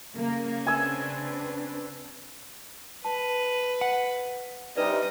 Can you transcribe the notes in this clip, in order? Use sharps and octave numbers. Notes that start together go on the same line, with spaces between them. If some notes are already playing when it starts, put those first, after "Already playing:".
C#3 A#3 C#4
C4 D4 B4 G#5 E6
B4 A5
F#5
C3 G3 D4 D#4 B4 D5 D#5